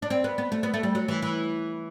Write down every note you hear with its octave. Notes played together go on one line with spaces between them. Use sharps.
D4
C4
B3
B3
A3
B3
A3
G3
F#3
E3
E3